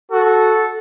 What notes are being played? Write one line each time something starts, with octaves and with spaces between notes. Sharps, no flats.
F#4 A4